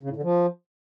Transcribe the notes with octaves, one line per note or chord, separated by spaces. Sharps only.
C#3
A2
D3
F3